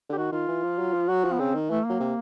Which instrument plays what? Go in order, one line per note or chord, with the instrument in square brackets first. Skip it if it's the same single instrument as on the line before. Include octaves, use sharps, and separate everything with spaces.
[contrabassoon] D3
[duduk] G4
[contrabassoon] D#3 [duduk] F#4
[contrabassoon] D#3 [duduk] F4
[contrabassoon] E3
F3
F#3
F3
[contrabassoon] F#3 [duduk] F#4
[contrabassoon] F3
[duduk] B3
[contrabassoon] C#3 [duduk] C4
[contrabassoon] D#3
[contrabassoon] E3 [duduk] A3
[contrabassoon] F#3 [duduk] A#3
[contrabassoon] C3